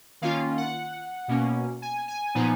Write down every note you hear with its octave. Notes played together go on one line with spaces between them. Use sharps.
D#3 A#3 C#4 F4 F5
F#5
B2 A#3 C#4
G#5
G#5
A#2 F3 B3 D#4